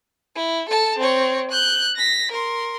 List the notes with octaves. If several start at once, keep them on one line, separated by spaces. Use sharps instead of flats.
E4
A4 A5
C4 C#5
F#6 G6
A#6 B6
A#4 C6